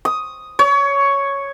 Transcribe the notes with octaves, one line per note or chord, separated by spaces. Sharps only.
D#6
C#5